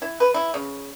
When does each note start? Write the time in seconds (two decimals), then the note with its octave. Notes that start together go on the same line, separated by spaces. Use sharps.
0.02 E4
0.20 B4
0.34 E4
0.54 C#3